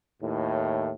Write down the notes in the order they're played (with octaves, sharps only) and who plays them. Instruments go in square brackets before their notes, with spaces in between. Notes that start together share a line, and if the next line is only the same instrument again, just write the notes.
[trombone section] D#2 A2